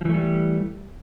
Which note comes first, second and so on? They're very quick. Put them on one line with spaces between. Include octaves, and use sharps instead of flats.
F3 E3 A3 G3